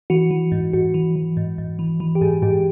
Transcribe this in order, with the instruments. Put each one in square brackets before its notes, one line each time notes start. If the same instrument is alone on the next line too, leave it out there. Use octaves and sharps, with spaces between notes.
[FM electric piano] E3 F#4
E3
G#2
G#2 F#4
E3
E3
G#2
G#2
E3
E3
G4
G#2 G#4
G#2 G4